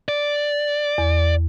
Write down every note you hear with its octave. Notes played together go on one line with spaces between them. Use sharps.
D5
E2